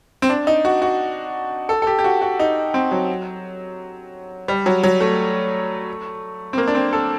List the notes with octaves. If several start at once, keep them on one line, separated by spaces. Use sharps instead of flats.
C4
D4
D#4
F#4
F#4
A4
A4
G4
G4
F#4
F#4
D#4
C4
F#3
G3
F#3
F#3
A3
C4
A#3
D4
C4
A4